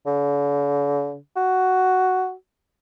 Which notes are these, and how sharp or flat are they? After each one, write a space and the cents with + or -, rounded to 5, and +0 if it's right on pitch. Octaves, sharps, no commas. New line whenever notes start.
D3 -45
F#4 +5